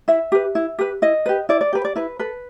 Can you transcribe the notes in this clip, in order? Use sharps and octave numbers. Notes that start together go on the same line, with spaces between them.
E4 E5
G4 B4
E4
G4 B4
E4 D#5
G4 B4
E4 D5
D5
G4 B4
D5
E4 B4
A4 B4